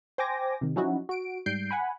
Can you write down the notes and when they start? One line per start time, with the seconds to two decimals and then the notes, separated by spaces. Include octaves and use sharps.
0.18 C5 G5 G#5 D6 A#6
0.61 C3 D#3
0.76 F3 F#3 C#4 D#4 E4 F#4
1.09 F#4 D7
1.46 G#2 G3 G6 C7 D7
1.71 F#5 G#5 B5